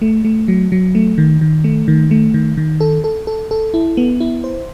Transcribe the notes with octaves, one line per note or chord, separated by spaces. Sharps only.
A3
A3
F#3
F#3
A3
D#3
D#3
A3
D#3
A3
D#3
D#3
A4
A4
A4
A4
E4
B3
E4
C5